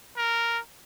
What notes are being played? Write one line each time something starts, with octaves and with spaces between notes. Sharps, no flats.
A#4